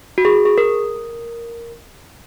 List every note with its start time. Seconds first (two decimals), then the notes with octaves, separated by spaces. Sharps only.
0.18 F#4
0.25 G#4
0.45 G#4
0.58 A#4